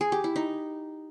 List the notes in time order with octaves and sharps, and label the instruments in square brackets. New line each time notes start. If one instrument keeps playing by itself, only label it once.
[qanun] G#4
G4
E4
D#4